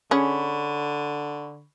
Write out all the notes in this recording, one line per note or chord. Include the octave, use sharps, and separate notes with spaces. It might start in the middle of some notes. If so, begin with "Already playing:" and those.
D3 C#4 G#4 B5 C#6